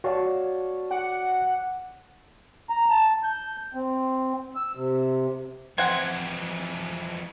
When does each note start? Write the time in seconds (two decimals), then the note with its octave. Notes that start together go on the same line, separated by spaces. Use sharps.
0.04 F#4 C#5 D5 F5 A5
0.91 F#5 D6
2.70 A#5
2.90 A5
3.24 G6
3.74 C4
4.56 E6
4.75 C3
5.78 F2 E3 C4 F#5 G#6